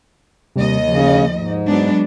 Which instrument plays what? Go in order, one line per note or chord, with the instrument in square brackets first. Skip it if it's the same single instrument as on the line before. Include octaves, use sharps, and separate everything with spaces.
[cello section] D#2 D#5 [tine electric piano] C3 G3
[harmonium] C#3 [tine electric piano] F3
[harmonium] G#2
[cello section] F#3 B3 D4 [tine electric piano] G#3